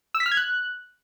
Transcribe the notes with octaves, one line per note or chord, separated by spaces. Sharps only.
E6
B6
F6
G#6
F#6